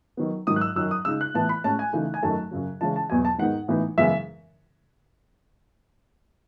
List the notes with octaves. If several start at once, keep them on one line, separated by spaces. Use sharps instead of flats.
D#3 F#3 B3
G#2 D#3 F#3 D#6
F#6
E6
F#2 D#3 F#3 E6
D#6
C#3 G#3 D#4 E6
F#6
A2 E3 B3 A5
B5
A2 G#3 C#4 A5
G#5
C#3 E3 A3 D#4
G#5
F#2 D#3 F#3 A3 A5
F#2 C#3 F#3
C#3 E3 G#3 C#4 A5
A5
E2 B2 F#3 G#5
A5
G#2 D#3 G#3 B3 D#4 F#5
A2 E3 B3 D#4
F#2 C#3 E3 G#3 B3 E5